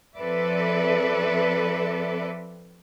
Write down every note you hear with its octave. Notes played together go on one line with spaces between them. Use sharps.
F3 C4 A4 B4 D5 E5